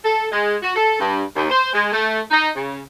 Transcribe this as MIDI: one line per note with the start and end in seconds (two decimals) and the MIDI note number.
0.04 0.26 69
0.32 0.55 56
0.62 0.73 66
0.75 0.95 69
0.99 1.22 43
1.36 1.47 39
1.50 1.69 72
1.73 1.90 56
1.92 2.21 57
2.31 2.48 63
2.55 2.79 49